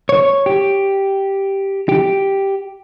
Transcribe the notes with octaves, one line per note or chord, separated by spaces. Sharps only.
C#5
G4
G4